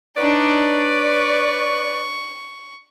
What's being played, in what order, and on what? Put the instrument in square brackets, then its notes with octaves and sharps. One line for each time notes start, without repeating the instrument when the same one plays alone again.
[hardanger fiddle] D4 D#4 [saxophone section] B4 C#5 D5
[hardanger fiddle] C#6